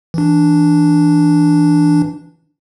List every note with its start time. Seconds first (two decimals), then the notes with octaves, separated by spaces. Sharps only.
0.14 E3 D4